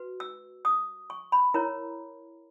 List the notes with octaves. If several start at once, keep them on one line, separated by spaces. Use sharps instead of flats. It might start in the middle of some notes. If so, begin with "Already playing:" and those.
Already playing: F#4 B4
E6
D#6
C#6
B5
E4 A#4 C#5 A#5